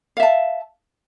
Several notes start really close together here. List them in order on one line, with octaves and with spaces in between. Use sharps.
F5 E5 A5